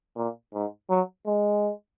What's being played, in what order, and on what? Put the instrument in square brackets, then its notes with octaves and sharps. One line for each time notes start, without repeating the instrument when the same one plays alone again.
[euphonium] A#2
G#2
F#3
G#3